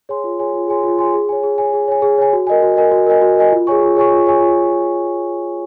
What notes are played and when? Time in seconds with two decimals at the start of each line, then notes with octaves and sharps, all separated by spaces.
0.09 G#4 C#5 G#5 C6
0.24 F4
0.39 G#4 C#5 G#5 C6
0.54 F4
0.68 G#4 C#5 G#5 C6
0.84 F4
0.99 G#4 C#5 G#5 C6
1.14 G#4
1.29 C#5 G#5
1.43 G#4
1.58 C#5 G#5
1.73 G#4
1.88 C#5 G#5
2.02 G#4
2.18 C#5 G#5
2.33 F#4
2.47 A#4 D#5 G#5
2.63 F#4
2.77 A#4 D#5 G#5
2.91 F#4
3.07 A#4 D#5 G#5
3.21 F#4
3.37 A#4 D#5 G#5
3.52 F4
3.67 G#4 C#5 G#5 C#6
3.81 F4
3.96 G#4 C#5 G#5 C#6
4.11 F4
4.26 G#4 C#5 G#5 C#6
4.40 F4